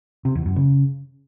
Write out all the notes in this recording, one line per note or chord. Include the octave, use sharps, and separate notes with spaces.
C3
E2
F#2
C#3